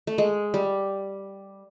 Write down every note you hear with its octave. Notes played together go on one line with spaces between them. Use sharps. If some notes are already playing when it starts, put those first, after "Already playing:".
A3
G#3
G3